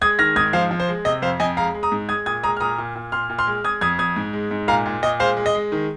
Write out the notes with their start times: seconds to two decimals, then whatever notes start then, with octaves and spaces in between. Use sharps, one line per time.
0.01 G#3 D#6 G#6
0.19 D#3 F6 A#6
0.36 G#2 D#6 G#6
0.53 F3 C5 F5
0.71 F3
0.80 C5
0.89 G#3
1.05 C3 D#5
1.22 F2 C5 F5
1.40 F2 D#5 G#5
1.57 G#3 F5 A#5
1.74 G#3
1.83 A#5 D#6
1.92 G#2
2.09 G#3 D#6 G#6
2.26 A#2 D#6 G#6
2.43 G#3 A#5 D#6
2.57 F6
2.60 A#2 A#5 D#6
2.78 A#2
2.96 A#2
3.12 A#2 C6 F6
3.30 A#2
3.39 C6 F6
3.47 G#3
3.64 G#3 D#6 G#6
3.81 F2 D#6 G#6
3.99 F2 D#6 G#6
4.16 G#2
4.33 G#3
4.51 G#2
4.68 A#2 F5 A#5
4.86 A#2
5.03 A#2 D#5
5.20 G#3 C5 F5
5.37 G#3
5.46 D#5
5.55 G#3
5.72 D#3